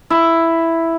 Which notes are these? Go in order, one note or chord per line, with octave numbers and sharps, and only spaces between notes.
E4